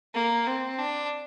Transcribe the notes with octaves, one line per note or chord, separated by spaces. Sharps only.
A#3
C4
D4